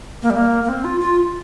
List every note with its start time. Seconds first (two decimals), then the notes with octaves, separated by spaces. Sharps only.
0.22 A#3
0.30 G3
0.36 A#3
0.64 A#3
0.69 C4
0.84 F4
1.00 F4